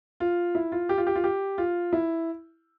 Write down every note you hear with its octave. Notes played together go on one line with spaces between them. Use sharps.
F4
E4
F4
G4
F4
G4
F4
G4
F4
E4